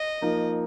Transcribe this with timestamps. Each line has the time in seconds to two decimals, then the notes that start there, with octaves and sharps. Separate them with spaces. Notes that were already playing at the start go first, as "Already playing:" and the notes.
Already playing: D#5
0.21 F3 A#3 D#4 A#4